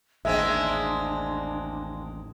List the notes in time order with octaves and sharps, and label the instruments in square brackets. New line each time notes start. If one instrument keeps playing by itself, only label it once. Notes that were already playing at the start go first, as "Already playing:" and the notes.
[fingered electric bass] A1 D#2 [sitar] G#3 A#3 C4 [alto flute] D4 [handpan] E5